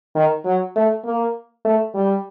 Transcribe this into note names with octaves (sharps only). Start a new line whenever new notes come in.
D#3
F#3
A3
A#3
A3
G3